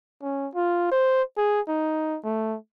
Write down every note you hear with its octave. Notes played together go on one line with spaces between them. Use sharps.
C#4
F4
C5
G#4
D#4
A3